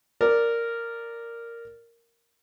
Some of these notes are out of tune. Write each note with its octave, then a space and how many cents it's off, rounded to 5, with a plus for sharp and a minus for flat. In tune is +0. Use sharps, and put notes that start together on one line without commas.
A#4 -5 D5 +0